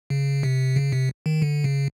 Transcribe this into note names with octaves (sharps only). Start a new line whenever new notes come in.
C#3
C3
C#3
C3
D#3
D3
C#3